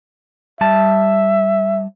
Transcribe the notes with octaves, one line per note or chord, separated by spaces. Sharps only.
G3 E5 A5